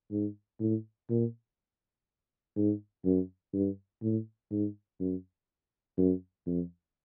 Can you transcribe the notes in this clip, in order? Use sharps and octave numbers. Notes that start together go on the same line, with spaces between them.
G#2
A2
A#2
G#2
F#2
G2
A2
G#2
F#2
F#2
F2